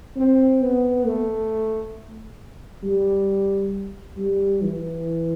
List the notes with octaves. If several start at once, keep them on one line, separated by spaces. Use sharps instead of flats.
C4
B3
A3
G3
G3
E3